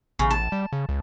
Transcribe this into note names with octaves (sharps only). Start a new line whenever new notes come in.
A1 C#3
A5
G3
C#3
C#2